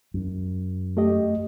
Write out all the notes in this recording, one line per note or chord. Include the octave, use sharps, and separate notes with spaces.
F#2
A3 G4 D#5